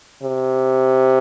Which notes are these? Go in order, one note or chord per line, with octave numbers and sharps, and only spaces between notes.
C3